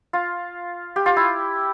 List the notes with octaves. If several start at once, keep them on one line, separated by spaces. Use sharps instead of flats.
F4
G4
F4
E4